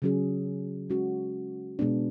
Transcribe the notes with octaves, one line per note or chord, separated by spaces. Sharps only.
C#3 F#3 C#4 G#4
G#3 C#4 F#4
B2 G#3 B3 D4